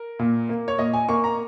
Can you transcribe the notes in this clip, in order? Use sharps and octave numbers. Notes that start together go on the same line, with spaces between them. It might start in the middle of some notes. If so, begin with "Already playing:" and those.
Already playing: A#4
A#2
A#3
C#5
A#2 D#5
G#5
A#3 C#6
A#5